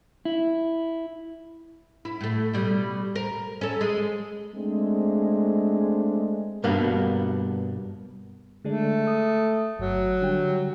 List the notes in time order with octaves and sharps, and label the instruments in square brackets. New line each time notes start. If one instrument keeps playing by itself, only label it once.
[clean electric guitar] E4
[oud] E4
A2 A3
B2 G3 A3
A#4
C#4 A4
G#3
[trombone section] G#3 A3 C4 D4
[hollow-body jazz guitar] G2 B2 G3 A#3 B3 D4
[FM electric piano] D3 G#3 D4 [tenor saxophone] A3
[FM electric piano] D#6
[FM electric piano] G1 [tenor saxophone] F#3
[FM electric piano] D3 G3 G5